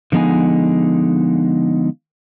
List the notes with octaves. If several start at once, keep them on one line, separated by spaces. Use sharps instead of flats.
D3 F3 G#3 B3 D#4 G#5